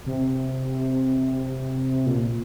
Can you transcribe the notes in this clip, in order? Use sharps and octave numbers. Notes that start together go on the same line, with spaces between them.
C3
A#2